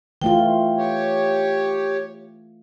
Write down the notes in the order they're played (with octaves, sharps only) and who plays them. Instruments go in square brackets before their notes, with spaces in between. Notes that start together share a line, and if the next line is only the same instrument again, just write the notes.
[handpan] E3 A3 F4 [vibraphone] G5
[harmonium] G4 C#5